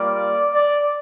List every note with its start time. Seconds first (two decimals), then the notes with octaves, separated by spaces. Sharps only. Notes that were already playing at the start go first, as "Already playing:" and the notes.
Already playing: G3 A#3 F4 D5
0.53 D5